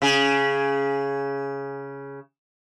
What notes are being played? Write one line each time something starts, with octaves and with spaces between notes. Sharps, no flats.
C#3 G#4